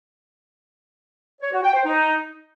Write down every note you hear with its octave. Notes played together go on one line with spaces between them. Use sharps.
C#5
F#4
G5
C5
D#4